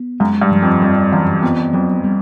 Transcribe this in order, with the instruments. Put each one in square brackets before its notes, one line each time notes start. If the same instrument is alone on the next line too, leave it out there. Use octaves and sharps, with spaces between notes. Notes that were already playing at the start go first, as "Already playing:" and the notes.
Already playing: [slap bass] B3
[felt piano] F#2 [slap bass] G#3
[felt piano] G2
[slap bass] F3
[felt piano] F2
[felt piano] F2 [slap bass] G3
[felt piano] F#2 [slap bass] E3
[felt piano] F2 [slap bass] B3
[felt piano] F2 [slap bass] F#3
[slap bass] G3